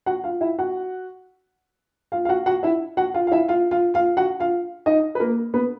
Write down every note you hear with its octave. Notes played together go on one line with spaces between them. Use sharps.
F#4 F#5
F4 F5
E4 E5
F#4 F#5
F4 F5
F5
F#4 F#5
F#4 F#5
E4 E5
F#4 F#5
F4 F5
F5
E4 E5
F4 F5
F4 F5
F4 F5
F#4 F#5
F4 F5
D#4 D#5
B4
A#3 A#4
B3 B4